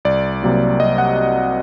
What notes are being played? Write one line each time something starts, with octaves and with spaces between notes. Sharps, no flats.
C2 D5
C3 F#3 A#3
C2 D#5
F#5